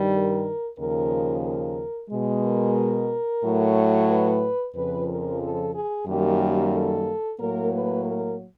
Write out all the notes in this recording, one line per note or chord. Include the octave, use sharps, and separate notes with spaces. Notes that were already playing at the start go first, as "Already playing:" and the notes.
Already playing: G2 D#3 G3
A#4
D#2 C#3 F3 A#4
A#4
B2 G#3
A#4
A2 F#3 A3
B4
F2 C#3 F3 B4
A#4
A4
G#4
F#2 D#3 G3 A#3 G4
A4
A2 F#3 A#3 A#4
B4
A#4